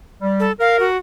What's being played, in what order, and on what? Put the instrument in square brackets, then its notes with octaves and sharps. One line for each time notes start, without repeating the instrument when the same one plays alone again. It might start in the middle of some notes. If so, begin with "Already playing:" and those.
[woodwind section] G3
[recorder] A4
[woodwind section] A#4 [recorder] F5
[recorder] F#4